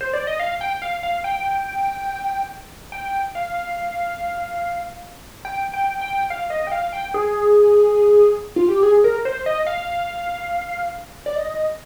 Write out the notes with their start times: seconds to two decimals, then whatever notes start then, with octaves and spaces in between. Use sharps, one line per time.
0.01 C5
0.13 D5
0.27 D#5
0.39 F5
0.61 G5
0.82 F5
1.03 F5
1.24 G5
2.92 G5
3.35 F5
5.45 G5
5.74 G5
6.01 G5
6.30 F5
6.50 D#5
6.67 G5
6.72 F5
6.93 G5
7.14 G#4
8.56 F4
8.69 G4
8.83 G#4
9.04 A#4
9.25 C5
9.46 D#5
9.67 F5
11.26 D5
11.36 D#5